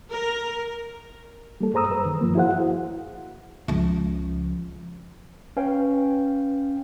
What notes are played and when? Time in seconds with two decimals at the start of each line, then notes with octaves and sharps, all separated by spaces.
0.12 A#4
1.61 G3 A#3 A4
1.73 G2 G#4 C5 A#5 D#6 E6
1.90 F#2 B4
2.05 D#3
2.21 G2 F3 A#3
2.35 E4 F#4 G#4 C5 F5 F#5
3.68 C#2 F3
5.57 C#4 B4 F5 G5